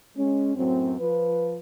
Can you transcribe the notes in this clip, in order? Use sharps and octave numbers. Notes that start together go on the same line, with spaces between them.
G#3 C#4
F#2 A2 F#3 C4
F3 B4